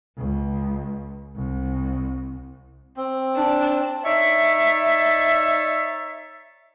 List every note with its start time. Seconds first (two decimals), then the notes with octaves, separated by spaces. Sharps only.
0.17 C#2
1.36 C2
2.96 C4
3.36 D4 A5
4.04 D#4 C#5 D5 E5